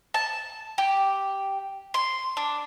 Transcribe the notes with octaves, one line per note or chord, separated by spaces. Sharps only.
A5
G4
C6
D4